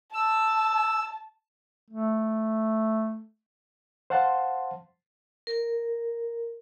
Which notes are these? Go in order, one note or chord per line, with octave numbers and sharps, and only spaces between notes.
A5 E6
A3
C5 F5 F#5 A5 C6
A#4